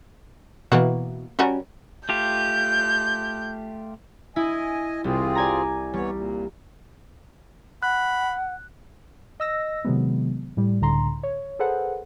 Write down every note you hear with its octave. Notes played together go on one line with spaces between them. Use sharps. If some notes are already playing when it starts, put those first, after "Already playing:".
B2 E3 A#3 F#4
G3 C#4 F#4 A#4
A3 F4 G4 G6
E4 D#5 G#5
C2 G3 C4 F4 G#4
D5 G#5 A#5
E3 G3 B3 C#5
A#2
F#5 B5 F#6
D#5 E6 A#6
C3 D#3 F#3 G#3 B3
A2 G3
C#2 A2 D3 A#5 C6
C#5
G#4 A4 B4 C5 F#5